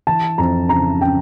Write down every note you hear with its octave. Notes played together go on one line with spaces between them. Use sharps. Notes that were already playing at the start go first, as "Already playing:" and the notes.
E3 A5
F2 A#5
C#3 A#5
C#3 G5